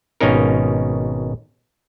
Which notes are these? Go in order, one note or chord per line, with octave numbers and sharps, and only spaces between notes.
G#1 B2 C#4 D#4 A#4